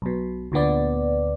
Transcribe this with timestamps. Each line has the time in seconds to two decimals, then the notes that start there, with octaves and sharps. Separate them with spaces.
0.02 B1 B2
0.52 D2 A#2 D3 B3 D5